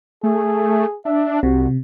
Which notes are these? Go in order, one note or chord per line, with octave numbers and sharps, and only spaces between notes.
A3 G#4
D4 E5
C2 C3 F#4